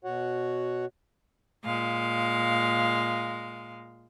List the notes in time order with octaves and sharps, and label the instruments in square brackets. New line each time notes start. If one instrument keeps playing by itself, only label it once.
[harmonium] B2 F#4 C#5 F#5
[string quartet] A#2 G#3 F5